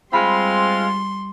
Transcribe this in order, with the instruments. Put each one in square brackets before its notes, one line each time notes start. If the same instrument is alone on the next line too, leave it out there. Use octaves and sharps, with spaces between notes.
[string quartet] G3 C6 [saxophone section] G#3 C4 F4 [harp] B5